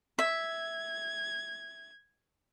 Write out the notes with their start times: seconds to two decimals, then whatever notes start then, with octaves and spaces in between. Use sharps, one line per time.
0.19 E5 G#6